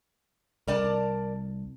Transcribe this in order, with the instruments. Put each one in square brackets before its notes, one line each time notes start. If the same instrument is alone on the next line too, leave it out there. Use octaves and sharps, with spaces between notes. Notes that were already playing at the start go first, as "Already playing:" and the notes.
[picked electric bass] C2 [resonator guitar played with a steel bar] A#4 D5 A5